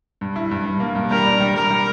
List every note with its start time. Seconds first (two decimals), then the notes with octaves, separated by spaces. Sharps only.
0.21 G2
0.36 E4
0.51 G2
0.65 G2
0.80 A#3
0.95 G2
1.10 G3 A#4
1.26 D4
1.40 G3
1.56 G3 A#4
1.70 G3